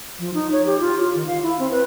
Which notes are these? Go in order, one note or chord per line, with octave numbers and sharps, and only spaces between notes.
F3
D#4
C#5
G4
F4
F4
D#3
F5
E4
C4
B4